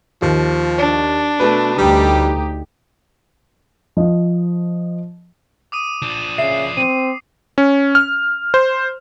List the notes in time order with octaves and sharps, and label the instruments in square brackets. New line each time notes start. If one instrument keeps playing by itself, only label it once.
[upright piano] D#2 [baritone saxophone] F3
[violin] D4
[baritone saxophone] B2 [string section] A3 [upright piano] B4
[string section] D2 D#4 G4 [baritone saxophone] G3
[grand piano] F3 D#5
[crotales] D6 D#6 D#7
[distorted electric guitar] F3 D4
[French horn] C#3 [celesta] E5 [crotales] C7
[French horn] C4 [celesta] D#7
[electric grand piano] C#4
F6
C5